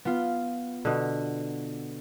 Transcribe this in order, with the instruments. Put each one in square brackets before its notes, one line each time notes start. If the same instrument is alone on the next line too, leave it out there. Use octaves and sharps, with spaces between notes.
[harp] B3 F4
[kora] B2 D3